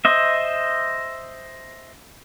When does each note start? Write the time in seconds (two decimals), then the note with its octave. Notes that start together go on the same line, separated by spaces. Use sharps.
0.05 C5 D#5 E5